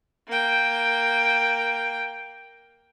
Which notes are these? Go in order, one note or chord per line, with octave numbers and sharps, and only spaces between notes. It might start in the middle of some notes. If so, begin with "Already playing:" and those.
A#3 G5